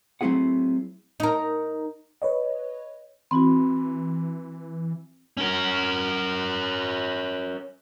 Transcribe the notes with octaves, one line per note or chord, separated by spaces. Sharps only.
F#3 A3 C4 E4 G#4 F#5
D#4 A#4
B4 C#5 D#5
E3 C4 E4 F#4 B5 C6
C#4 A#4